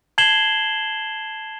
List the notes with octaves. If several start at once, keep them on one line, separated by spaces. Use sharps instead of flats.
A5 G#6 C7 E7 F#7 G7